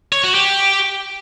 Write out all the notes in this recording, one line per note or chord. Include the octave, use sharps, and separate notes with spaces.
C#5
F#4
G4